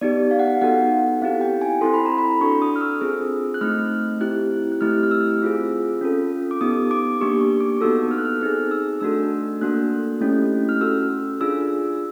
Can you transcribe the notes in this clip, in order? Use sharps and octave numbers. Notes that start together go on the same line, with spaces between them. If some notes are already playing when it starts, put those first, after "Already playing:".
B3 D#4 G4 D5
F5
F#5
F5
B3 D#4 F#4 A4 F#5
C4 E4 G4 F5
G5
G#5
C4 E4 A4 C6
B5
A#5
B5
D4 F#4 A4 C#6
D#6
F6
E6
C4 F4 G#4
F#6
A3 C4 D#4 F6
C4 E4 G4 F#6
F#6
A3 C4 E4 G4 F6
F6
E6
C4 F4 G#4
C#4 F4 A4
D6
B3 D#4 G4 D#6
D6
A#3 D4 G4 C#6
C#6
D6
B3 D#4 F#4 A4 E6
F6
F#6
F6
C4 D#4 G#4 F6
E6
A3 D4 F#4 A4 E6
A#3 D4 F#4 A4 F#6
A3 C#4 E4 G4
F6
C#4 F#4 A4 E6
D4 F4 G#4 E6